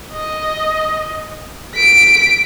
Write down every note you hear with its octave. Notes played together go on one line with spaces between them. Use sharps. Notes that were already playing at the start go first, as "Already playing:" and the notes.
D#5
B6 D7